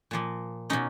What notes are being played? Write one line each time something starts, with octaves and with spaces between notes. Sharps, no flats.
A#2 F3 A#3
B2 A#3 C#4 D#4